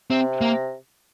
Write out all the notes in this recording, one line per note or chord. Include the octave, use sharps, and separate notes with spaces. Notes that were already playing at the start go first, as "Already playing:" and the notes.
C3 C4
A#3